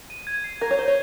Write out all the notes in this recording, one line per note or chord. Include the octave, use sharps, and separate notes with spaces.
D#7
G#6
C7
A#4 G#6
C#5
C5 G7
C#5